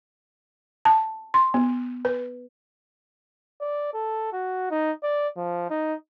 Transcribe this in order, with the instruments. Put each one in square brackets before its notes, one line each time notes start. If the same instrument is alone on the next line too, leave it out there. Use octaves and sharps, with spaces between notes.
[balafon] A5
C6
B3
B4
[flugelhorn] D5
A4
F#4
D#4
D5
F3
D#4